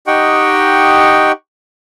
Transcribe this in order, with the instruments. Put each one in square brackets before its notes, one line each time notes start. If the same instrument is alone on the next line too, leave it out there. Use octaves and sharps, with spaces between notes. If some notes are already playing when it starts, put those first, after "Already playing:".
[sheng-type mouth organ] D#4 G4 D#5 F#5 G5 C#6